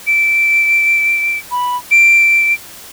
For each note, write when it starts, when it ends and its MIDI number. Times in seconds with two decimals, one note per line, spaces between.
0.07 1.38 98
1.51 1.77 83
1.91 2.53 98